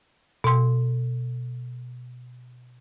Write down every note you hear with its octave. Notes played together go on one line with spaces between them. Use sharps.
B2 C6